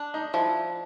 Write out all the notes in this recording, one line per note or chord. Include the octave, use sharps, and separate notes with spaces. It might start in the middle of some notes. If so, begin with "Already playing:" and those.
Already playing: D4
D#4
F3 E4